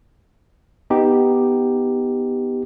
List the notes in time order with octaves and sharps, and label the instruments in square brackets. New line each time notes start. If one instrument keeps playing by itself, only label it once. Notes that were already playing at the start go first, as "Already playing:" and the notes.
[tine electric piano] B3 D#4 G4